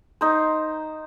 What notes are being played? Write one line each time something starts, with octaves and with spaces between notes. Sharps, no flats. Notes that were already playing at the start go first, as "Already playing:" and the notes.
D#4 C5